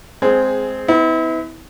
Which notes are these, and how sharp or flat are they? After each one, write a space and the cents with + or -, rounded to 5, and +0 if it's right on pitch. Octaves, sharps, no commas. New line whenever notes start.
G#3 +0 C4 -5 G#4 +15
B3 +35 E4 -35